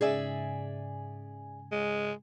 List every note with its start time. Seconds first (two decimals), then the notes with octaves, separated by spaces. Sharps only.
0.01 G#2 C#3 G#4 D5 E5 G#5
1.72 G#3